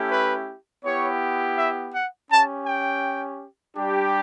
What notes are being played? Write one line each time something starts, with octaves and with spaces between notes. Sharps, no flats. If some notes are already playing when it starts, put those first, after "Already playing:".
Already playing: A3 C#4 E4 G4
B4
B3 E4 G4 C#5
E5
F#5
C#4 G4 A5
G5
G3 D4 G4